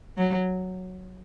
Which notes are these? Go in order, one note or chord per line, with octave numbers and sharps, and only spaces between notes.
F#3